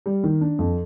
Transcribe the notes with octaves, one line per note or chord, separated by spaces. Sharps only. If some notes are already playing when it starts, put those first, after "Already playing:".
G3
D#3
D4
F2